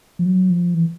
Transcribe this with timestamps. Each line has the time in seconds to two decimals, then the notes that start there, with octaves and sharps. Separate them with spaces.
0.19 F3
0.26 F#3
0.50 F3
0.74 E3